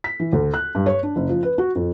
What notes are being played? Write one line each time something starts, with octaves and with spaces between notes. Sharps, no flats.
B6
E3
D2
F#6
G2
C#5
D4
F#1
F3
B4
F#4
F2